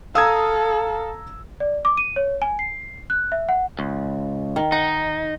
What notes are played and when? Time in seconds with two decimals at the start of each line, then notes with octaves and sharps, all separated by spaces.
0.15 A4 F5 A#5 D#6 E6 G#6
1.60 D5
1.85 D6
1.97 D#7
2.16 C#5
2.42 G#5
2.59 C7
3.10 F#6
3.32 E5
3.49 F#5
3.79 C#2
4.56 D#3
4.72 D#4 F#5